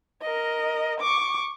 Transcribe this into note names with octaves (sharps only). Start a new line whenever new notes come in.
A#4 D#5
C#6 D6